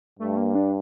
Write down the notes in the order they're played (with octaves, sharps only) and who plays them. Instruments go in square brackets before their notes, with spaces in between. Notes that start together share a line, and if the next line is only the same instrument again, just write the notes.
[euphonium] G2 [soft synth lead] A3
[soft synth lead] A#3
D4